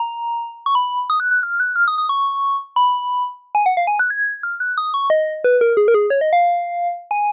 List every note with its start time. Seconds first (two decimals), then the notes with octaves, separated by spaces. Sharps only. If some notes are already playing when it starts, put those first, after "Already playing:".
Already playing: A#5
0.66 C#6
0.75 B5
1.10 D#6
1.20 F#6
1.31 F#6
1.43 F6
1.60 F#6
1.76 F6
1.88 D#6
1.98 D#6
2.09 C#6
2.76 B5
3.55 G#5
3.66 F#5
3.77 F5
3.87 G#5
3.99 F#6
4.10 G#6
4.43 F6
4.60 F#6
4.78 D#6
4.94 C#6
5.10 D#5
5.44 B4
5.61 A#4
5.77 G#4
5.88 A#4
5.94 G#4
6.10 C#5
6.21 D#5
6.33 F5
7.11 G#5